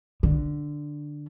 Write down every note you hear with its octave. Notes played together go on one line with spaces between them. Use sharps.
D3